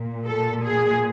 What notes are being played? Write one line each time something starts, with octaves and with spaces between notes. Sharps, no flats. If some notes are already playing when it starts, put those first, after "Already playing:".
Already playing: A#2
A4
G#4